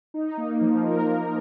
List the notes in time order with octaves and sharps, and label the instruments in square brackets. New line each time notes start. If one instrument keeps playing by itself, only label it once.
[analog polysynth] D#4
A#3
F3
A#4
D#4